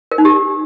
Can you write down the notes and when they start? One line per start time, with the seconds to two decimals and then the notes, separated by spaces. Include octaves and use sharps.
0.12 A#4
0.18 D#4
0.25 G4